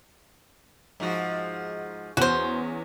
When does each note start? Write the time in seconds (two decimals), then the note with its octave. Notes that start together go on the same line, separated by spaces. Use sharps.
1.00 G#2 F3 F#4
2.17 E2 C#4 F#4 C5